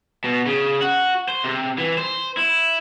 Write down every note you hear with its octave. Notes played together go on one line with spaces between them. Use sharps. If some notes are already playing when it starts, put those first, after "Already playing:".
B2
C#3
F#4
C5
C3
E3
C5
E4